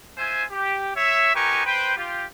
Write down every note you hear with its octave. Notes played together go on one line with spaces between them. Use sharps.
F4 C5 E5 G#5
G4
C#5 E5
D#4 G4 A#4 B4 G#5 C#6
B4 C5 G5
F4 G4